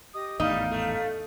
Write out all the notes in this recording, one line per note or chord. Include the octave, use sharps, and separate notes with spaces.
G4 D#5 D#6
G#1 E2 A2 G3 D#4 F5
A3